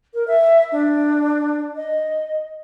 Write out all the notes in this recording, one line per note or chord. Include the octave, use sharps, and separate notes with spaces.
A#4
E5
D4
D#5